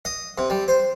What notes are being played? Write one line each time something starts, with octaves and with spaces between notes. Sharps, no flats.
D#5
C3
G3
C5